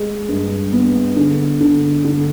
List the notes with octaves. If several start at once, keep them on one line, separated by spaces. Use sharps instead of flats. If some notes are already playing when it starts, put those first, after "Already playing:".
Already playing: G#3
G2
B3
D3
D3
D3